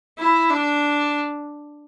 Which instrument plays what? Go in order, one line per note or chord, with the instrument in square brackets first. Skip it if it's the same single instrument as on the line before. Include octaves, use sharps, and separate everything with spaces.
[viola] E4
D4